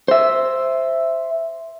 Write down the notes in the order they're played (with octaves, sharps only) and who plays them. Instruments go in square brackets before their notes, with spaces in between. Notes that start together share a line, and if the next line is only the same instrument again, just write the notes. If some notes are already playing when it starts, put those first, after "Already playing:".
[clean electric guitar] C5 E5